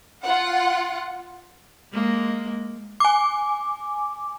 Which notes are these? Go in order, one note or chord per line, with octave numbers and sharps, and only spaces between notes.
F4 F#5
G#3 A#3
G#5 D6